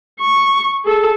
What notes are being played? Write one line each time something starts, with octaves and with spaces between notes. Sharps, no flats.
C#6
G#4 A4